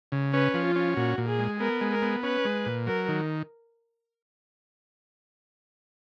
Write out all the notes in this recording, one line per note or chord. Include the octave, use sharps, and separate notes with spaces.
C#3
C#4 B4
F3
F4
C#4
A#2 F#4
A#2
G#4
G#3
B3 A#4
G#3
A#4
B3
C#4 B4
G#3
A#2
F#3 A#4
D#3